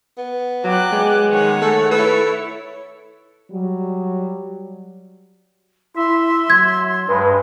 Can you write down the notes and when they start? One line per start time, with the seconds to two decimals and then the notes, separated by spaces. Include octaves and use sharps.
0.18 B3
0.64 F#3 D5 G5 F#6
0.92 G#3
1.29 D#3 C#5 F#5
1.62 A3 A4
1.91 E4 A4 B4 C#5
3.52 F#3 G3
5.96 E4 E5 C6
6.50 F#3 G#6
7.08 G2 G#3 B4